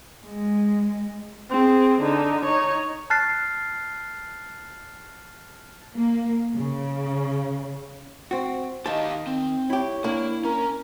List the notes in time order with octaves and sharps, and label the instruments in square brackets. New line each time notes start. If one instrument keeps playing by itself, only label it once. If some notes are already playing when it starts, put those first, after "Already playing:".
[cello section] G#3
[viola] C4 G#4
D3 D#4
D#4 C#5
[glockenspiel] A5 F6 F#6 A6 C7
[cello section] A#3
C#3
[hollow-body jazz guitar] C4 F#4
[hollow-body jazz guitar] D#3 A5 [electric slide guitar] G4 D#5 F5
[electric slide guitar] C4
[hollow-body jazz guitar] E4 G4 [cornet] C#5
[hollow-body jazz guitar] A#3 D4 [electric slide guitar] E4
[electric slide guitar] C#4 [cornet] A#4